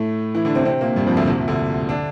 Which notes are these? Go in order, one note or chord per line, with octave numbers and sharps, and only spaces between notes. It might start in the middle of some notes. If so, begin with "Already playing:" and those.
Already playing: A2 A3
E3 E4
D3 D4
C3 C4
C3 C4
A#2 A#3
G2 G3
F2 F3
D2 D3
C2 C3
A#2
D2 D3
D3 D4